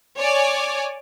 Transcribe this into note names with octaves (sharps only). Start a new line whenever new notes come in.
C#5 D5 G#5